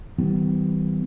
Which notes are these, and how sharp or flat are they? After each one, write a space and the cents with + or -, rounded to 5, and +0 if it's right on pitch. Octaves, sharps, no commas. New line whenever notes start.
D#3 +45 G3 -35 B3 +35